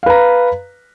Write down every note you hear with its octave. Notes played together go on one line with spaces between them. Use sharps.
B4 F5 A#5